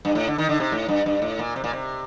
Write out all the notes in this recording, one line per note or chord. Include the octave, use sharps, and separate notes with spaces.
G2
A2
D3
D#3
D3
C3
A2
G2
G2
A2
A#2
C3
A#2
C3